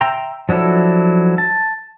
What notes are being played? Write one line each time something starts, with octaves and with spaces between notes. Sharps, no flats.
E5 G5 A#5 C6
F3 F#3 D4 E4 A4
A5